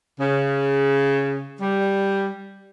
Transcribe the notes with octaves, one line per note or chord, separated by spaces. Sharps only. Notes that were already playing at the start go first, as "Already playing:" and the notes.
C#3
G3